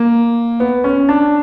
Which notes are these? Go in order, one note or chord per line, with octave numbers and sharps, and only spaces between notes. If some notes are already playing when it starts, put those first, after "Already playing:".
Already playing: A#3
B3
C#4
D4